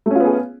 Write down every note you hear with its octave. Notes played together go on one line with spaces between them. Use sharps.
A3 B3 C#4 F4 G#4